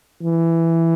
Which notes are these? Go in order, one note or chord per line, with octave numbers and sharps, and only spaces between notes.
E3